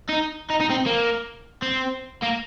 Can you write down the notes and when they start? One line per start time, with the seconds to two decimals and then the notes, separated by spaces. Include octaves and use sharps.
0.09 D#4
0.50 D#4
0.61 D#4
0.70 C4
0.86 A#3
1.62 C4
2.23 A#3